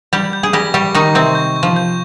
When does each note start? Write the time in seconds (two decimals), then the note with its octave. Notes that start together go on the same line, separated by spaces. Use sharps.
0.13 G3 G4 G6
0.33 G6
0.43 G#4
0.53 G3 G4 A#6
0.74 G3 G4 C#6
0.95 D#3 D#4 C#6
1.15 C3 C4 G6
1.35 G6
1.56 G6
1.63 F3
1.76 G6